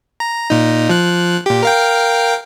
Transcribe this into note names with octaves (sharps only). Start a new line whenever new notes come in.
A#5
A#2 D#4
F3 F#6
A#2 G4
A#4 F5 G5